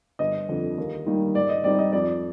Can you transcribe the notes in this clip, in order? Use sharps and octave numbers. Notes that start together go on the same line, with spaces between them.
G1 D#5
F2 D3
D#2
D#3 G3 A#3 D#4
G#2 D5
D#5
G3 C4 D#4 D5
D#5
F2 D5